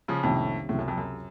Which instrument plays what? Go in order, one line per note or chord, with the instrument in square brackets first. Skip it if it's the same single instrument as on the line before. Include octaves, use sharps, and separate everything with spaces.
[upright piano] C#3 F3
[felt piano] C2 C3 D#3 A#3 C#4 [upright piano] F2 A2
[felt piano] C#2 C3 F#3 C4 [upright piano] A2
[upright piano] F#2
F2
F#2